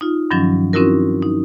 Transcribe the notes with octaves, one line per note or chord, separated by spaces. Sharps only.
D#4 F4
G2 D#3 F3 F#3 C#4
C4 C#4 D#4 E4 F#4 A#4
D#4